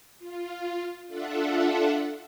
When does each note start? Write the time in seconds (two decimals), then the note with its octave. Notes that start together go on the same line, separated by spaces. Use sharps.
0.19 F4
1.07 D4 F4 A4 E5 F#5